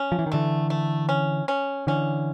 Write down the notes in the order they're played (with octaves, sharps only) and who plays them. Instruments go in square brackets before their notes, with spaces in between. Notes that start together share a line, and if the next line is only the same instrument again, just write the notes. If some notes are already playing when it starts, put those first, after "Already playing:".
Already playing: [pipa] C#4
[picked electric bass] F3
E3
D#3
[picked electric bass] D3 E3 [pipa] A3
[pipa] A3
C#4
C#4
[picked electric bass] D3 E3 [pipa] C#4